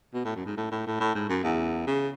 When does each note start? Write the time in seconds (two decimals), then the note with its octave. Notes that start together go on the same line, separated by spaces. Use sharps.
0.14 B2
0.25 A2
0.35 F#2
0.46 G#2
0.57 A2
0.71 A2
0.86 A2
1.00 A2
1.15 G#2
1.29 F#2
1.43 E2
1.87 C#3